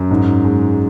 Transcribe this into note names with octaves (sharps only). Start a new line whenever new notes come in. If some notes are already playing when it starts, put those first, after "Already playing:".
Already playing: F#2
G#2
G#3